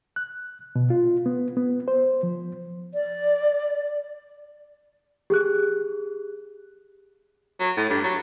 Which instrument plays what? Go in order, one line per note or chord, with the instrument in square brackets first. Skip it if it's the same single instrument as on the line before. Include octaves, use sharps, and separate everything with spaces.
[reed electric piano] F#6
B2
F4
B3
B3
C5
F3
[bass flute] D5
[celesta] G4 G#4 F#6
[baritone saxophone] F#3
A2
G2
F#3